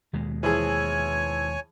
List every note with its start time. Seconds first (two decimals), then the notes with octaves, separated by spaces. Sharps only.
0.13 D#2 B2 G#3
0.43 E3 F3 G#4 C#5 G#5